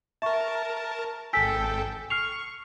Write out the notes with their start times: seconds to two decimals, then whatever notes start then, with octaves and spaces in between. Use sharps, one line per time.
0.22 A#4 E5 A5 C#6
1.33 G#1 A4 G5 G#5 E6 B6
2.10 C#6 F6 C7 F7